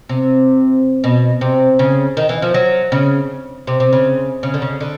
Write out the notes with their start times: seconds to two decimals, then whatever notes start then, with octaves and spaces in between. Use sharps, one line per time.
0.09 C3
1.04 B2
1.41 C3
1.79 C#3
2.17 D#3
2.29 E3
2.42 F3
2.54 F#3
2.92 C#3
3.67 C3
3.80 C3
3.93 C#3
4.43 C#3
4.54 D3
4.62 C#3
4.81 D3